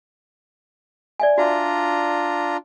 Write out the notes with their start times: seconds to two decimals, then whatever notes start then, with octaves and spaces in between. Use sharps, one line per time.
1.20 D5 E5 G#5
1.38 D4 F4 F#4 E5 A#5